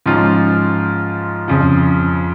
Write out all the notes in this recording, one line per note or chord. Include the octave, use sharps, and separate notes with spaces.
G#2 F3 C#4 F4
F2 C#3 F3